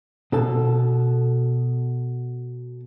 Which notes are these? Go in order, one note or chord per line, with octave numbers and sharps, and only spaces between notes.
B2 A4 A5